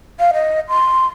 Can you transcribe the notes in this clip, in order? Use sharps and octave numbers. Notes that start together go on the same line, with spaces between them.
F5
D#5
C6